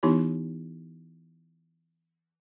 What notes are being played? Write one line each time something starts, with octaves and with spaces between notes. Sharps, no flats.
E3 B3 D#4 E4 G4 C#5